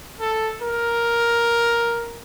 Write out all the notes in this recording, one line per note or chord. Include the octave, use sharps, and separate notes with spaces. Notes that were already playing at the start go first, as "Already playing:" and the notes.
A4
A#4